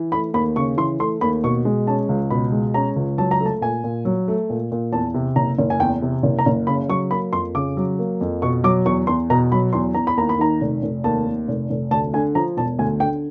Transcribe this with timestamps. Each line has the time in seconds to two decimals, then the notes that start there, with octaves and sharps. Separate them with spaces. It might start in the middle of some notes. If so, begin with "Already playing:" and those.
Already playing: E3
0.12 A3 B5
0.34 D#2 B5
0.56 C#3 C#6
0.77 E3 C6
1.00 A3 C6
1.21 D#2 B5
1.44 B2 C#6
1.65 G#3
1.87 C#4 A5
2.09 C#2
2.30 B2 B5
2.52 G#3
2.74 C#4 A#5
2.96 C#2
3.18 F#3 A5
3.31 A#5
3.41 A3 A5
3.61 A#2 G#5
3.84 A#2
4.05 F#3
4.28 A3
4.50 A#2
4.72 A#2
4.93 E2 A5
5.14 C3
5.36 F#1 A#5
5.59 F#1
5.70 G#5
5.80 E2 G5
6.02 C3
6.23 F#1
6.39 A#5
6.46 F#1
6.67 C#3 B5
6.89 F#3 C#6
7.11 A#3 B5
7.33 F2 C6
7.55 C#3 D6
7.77 F#3
7.99 A#3
8.21 F2
8.42 B2 C#6
8.64 F#3 D6
8.86 E2 C#6
9.07 E2 C6
9.30 B2 A#5
9.52 F#3 B5
9.73 E2 C6
9.94 E2 A#5
10.07 B5
10.17 D#2 A#5
10.29 B5
10.39 D#3 A#5
10.61 F1
10.83 F1
11.04 D#2 A5
11.26 D#3
11.48 F1
11.70 F1
11.91 D2 A5
12.13 D3 G#5
12.35 F3 A#5
12.57 E1 A5
12.79 D2 G#5
13.00 D3 G5